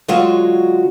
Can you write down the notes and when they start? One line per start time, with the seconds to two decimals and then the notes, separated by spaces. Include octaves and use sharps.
0.08 D3 F#3 G#3 F4 F#4